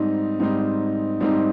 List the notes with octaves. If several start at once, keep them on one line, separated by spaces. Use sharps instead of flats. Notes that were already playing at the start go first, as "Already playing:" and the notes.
Already playing: G#2 G3 C4 D#4
G#2 G3 C4 D#4
G#2 G3 C4 D#4